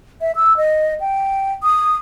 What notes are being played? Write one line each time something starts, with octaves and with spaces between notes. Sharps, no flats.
E5
E6
D#5
G5
D#6